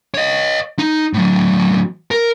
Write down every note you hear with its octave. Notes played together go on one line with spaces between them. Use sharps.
C#5 D#5
D#4
A2 F#3
A#4